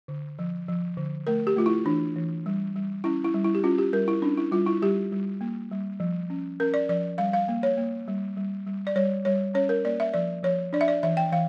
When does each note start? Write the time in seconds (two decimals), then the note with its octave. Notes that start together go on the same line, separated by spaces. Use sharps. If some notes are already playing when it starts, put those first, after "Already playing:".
0.08 D3
0.39 F3
0.68 F3
0.97 D3
1.27 A3 A#4
1.47 G4
1.56 A3 F4
1.66 E4
1.86 E3 D4
2.16 E3
2.46 G3
2.75 G3
3.04 C#4 E4
3.24 E4
3.34 G3
3.44 E4
3.55 G4
3.63 C#4 F4
3.78 G4
3.93 G3 A#4
4.08 E4
4.22 C#4 D4
4.38 E4
4.52 G3 F4
4.67 E4
4.82 G3 G4
5.12 G3
5.41 A#3
5.71 G3
6.00 F3
6.30 C#4
6.60 C#4 A#4
6.74 D5
6.89 F3 D5
7.18 G3 F5
7.33 F5
7.48 A#3
7.63 C#5
7.78 A#3
8.08 G3
8.37 G3
8.66 G3
8.87 D5
8.96 G3 C#5
9.25 G3 C#5
9.54 C#4 C#5
9.69 A#4
9.85 A#3 D5
10.00 E5
10.14 F3 D5
10.43 F3 C#5
10.73 D4 D5
10.81 E5
10.88 D5
11.03 E3 E5
11.17 G5
11.32 E3 F5